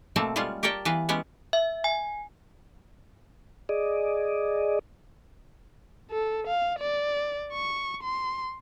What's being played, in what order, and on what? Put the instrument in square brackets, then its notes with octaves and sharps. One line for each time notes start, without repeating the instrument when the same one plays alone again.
[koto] B2 A3 A#3 C4
G3 G#3 C#4 F4
G4 A#4 C#5 D5 G5 A5
E3 B3 B4 F5
G#3 B3 C#4 G4
[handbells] E5
G#5
[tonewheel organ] G#4 D5 D#5
[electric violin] A4
F5
D5
C#6
C6